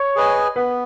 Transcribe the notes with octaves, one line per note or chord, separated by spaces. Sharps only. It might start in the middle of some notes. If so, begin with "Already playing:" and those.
Already playing: C#5
G#4 B4 D#5 G#5
B3 B4